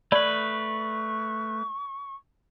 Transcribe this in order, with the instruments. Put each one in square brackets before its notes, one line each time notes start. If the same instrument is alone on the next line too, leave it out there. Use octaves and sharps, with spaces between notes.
[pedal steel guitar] A3 B4 [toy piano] D5 B5 [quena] C#6